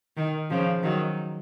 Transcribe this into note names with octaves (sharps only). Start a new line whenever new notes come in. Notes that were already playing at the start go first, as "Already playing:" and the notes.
D#3
C#3 F3
D#3 F#3